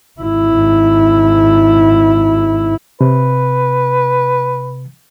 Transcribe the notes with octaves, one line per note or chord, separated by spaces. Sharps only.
G#1 E4
C3 B4